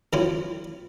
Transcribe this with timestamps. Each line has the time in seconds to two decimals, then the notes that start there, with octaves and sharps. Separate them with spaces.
0.13 D3 F#3 C4 E4 F4 C5